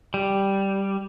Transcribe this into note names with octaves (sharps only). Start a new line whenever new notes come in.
G3